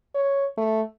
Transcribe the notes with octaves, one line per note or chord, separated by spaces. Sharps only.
C#5
A3